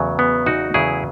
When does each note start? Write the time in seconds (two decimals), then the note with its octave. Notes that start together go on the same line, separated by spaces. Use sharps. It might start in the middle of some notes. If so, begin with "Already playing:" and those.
Already playing: E2 C#3 F#3 A3
0.19 B3
0.46 D#4 F#4
0.74 E2 C#3 F#3 A3 E4 G#4